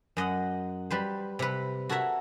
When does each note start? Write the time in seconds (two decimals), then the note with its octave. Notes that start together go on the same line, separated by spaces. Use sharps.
0.17 F#2 D#5 F#5
0.90 G3 B4 C5
1.39 C3 B4
1.89 F#4 A4 A#4 C#5 E5